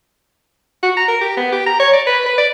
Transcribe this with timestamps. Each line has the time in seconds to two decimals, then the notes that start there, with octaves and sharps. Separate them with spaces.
0.83 F#4
0.97 A#5
1.08 A#4
1.21 G4
1.37 B3
1.52 G4
1.66 A#5
1.80 C#5
1.93 D5
2.07 B4
2.26 B4
2.38 D5